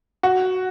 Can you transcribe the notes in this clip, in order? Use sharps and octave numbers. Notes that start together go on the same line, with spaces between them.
F#4